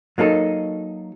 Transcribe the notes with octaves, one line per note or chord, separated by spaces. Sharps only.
F#3 A#3 D#4 A4